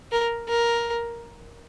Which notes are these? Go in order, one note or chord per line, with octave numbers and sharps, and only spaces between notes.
A#4
A#4